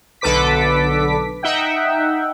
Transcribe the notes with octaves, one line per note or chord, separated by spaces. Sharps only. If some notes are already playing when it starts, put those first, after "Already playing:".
B1 D3 A4 B4 D6 B6
D#4 E5 F#5 G5